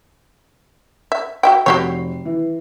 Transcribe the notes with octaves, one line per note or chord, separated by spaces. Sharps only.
E5
F#4 E5 G5
F1 F#4 G4 C#5 C7
E3